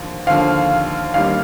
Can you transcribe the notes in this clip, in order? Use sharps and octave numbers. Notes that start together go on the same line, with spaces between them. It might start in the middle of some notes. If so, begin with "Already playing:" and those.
Already playing: D#2 D3 F3
D#2 D3 F3 F5
A1 G2 D#3 G3 A#3 F5